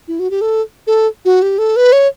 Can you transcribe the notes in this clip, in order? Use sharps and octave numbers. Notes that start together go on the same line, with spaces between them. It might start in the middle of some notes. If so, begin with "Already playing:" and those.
E4
F#4
G4
A4
A4
F#4
G4
A4
B4
C#5